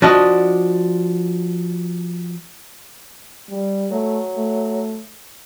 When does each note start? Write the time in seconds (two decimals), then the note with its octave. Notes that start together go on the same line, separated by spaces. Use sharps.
0.02 F3 D4 F#4 D#5
3.50 G3
3.91 F#3 A3
4.37 A3